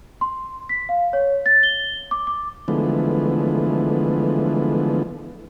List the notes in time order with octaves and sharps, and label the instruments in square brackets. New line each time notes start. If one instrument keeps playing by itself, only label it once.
[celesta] C6
B6
F5
C#5
A6
G7
D6
D6
[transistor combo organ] D3 E3 F3 G#3 A3 B3